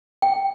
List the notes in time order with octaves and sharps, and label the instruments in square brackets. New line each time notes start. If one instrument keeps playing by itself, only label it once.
[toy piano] G5